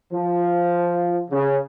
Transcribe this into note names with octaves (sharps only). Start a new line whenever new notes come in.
F3
C#3